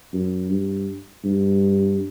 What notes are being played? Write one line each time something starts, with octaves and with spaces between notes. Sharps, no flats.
F#2
G2
G2